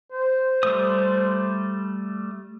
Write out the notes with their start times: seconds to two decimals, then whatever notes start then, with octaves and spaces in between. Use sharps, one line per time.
0.12 C5
0.63 G3 A3 D#6